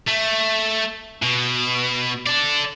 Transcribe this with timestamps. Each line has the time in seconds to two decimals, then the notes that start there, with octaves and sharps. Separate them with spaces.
0.07 A3
1.22 B2
2.26 A4 D5